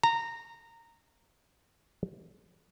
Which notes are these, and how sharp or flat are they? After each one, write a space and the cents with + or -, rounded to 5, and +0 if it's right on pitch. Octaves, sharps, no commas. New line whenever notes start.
A#5 -15